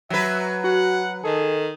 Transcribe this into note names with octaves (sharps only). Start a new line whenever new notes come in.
F#3 B4 E5
F#4 F#5
D#3 G#4 A4